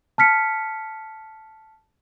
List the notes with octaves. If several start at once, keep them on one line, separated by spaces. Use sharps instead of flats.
A5 F6 B6 C#7